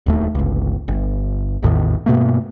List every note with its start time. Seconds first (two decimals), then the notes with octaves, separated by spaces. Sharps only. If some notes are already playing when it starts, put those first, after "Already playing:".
0.06 D1 D#2 A3
0.35 G1 C#2
0.88 G1
1.63 A1 E2 A2 D#3
2.06 G2 B2 A3 A#3